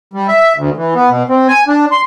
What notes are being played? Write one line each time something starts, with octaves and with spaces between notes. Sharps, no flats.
G3
E5
D2
E3
B3
B2
C4
G#5
D4
C6